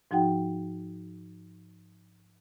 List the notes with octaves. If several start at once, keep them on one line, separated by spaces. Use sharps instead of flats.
G#2 F3 D#4 F#4 F#5 G5